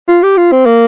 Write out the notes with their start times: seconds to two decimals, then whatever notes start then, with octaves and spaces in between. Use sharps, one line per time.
0.08 F4
0.23 G4
0.37 F4
0.52 C4
0.66 A#3